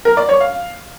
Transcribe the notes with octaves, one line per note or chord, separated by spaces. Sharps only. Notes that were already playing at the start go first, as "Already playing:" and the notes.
A#4
D5
C#5
F5